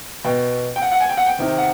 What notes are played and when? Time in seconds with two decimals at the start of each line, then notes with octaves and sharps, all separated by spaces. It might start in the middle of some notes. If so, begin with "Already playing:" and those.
0.25 B2 G5
0.76 G5
0.82 F#5
0.92 F#5
1.00 G#5
1.09 G5
1.17 F#5
1.26 G5
1.39 C3 D#3
1.58 F#5